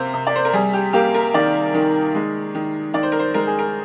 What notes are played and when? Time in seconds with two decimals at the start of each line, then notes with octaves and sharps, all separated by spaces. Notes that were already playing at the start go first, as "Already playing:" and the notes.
Already playing: C3 A#3 A#4 C5
0.14 C3
0.27 D5
0.35 C5
0.45 A#4
0.53 G3 G#4
0.73 G4
0.93 A#3 G4
1.14 A#4
1.34 D#3 D5
1.74 D#3
2.15 G#3
2.55 D#3
2.94 D#3 D5
3.03 C5
3.12 A#4
3.19 C5
3.34 G#3 A#4
3.47 G#4
3.59 A#4